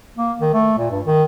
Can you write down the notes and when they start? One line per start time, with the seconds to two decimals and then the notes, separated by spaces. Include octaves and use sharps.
0.18 A#3
0.41 D#3
0.53 A3
0.78 A#2
0.91 G2
1.05 D#3